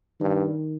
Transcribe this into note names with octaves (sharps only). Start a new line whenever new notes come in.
G2 D#3